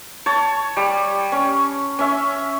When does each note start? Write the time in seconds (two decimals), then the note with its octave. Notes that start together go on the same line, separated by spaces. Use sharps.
0.26 C#5 A5
0.77 G3
1.32 C#4
1.99 C#4 E5